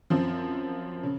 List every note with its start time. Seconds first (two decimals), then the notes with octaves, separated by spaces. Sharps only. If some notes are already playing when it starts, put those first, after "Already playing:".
0.10 F#2 F3 C4
1.03 C#3